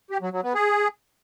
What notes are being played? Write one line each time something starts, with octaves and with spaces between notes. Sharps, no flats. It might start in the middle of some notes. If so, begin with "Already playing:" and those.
G4
F#3
F#3
B3
G#4